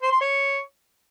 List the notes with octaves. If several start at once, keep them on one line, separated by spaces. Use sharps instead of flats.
C5
C6
C#5